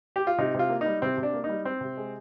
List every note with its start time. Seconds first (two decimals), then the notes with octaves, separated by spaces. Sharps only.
0.16 G4
0.27 F4
0.38 C3 D#4
0.54 C3 F4
0.70 A#3
0.81 G3 D#4
1.02 C3 C4
1.18 C3
1.23 D4
1.34 A#3
1.44 D#4
1.49 G3
1.65 C4
1.81 C3
1.98 G#3